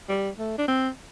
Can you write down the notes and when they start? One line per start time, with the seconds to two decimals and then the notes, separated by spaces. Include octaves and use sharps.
0.08 G3
0.39 A3
0.58 D4
0.68 C4